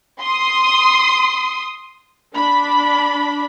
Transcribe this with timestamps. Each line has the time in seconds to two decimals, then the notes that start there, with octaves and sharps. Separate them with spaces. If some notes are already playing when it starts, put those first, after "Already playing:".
0.20 C6 D#6
2.35 D4 B5